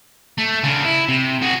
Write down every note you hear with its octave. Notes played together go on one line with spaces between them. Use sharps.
A3
C#3 D4
E4
C3
F#4 G#4